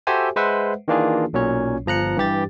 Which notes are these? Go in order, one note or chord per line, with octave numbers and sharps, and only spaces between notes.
F#4 G4 A4 C5 E5 G#5
G#3 B4 C5 E5 F#5
D#3 E3 A#3 D4 F4 G#4
B1 A#2 F#3 C#4 C#5
G1 F3 A#5 F#6 C#7
G2 E3 G4 A6